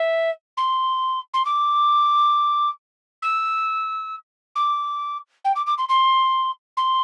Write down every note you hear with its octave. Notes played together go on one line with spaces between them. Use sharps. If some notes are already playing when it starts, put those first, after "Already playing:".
Already playing: E5
C6
C6
D6
E6
D6
G5
D6
D6
C6
C6
C6